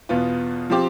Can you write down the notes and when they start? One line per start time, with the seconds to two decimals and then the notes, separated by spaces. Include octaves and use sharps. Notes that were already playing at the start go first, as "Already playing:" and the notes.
0.09 E2 B2 B3 F4
0.70 F3 C4 G4